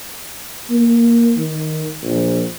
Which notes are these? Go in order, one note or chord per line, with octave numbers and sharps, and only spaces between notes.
A#3
D#3
A#1